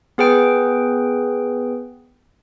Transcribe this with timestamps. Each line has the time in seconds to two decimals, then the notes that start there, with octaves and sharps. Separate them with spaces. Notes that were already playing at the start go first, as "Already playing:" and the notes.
0.18 B3 G#4 B4 G5 D7